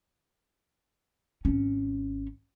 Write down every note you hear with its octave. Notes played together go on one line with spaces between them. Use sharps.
G#1 C#4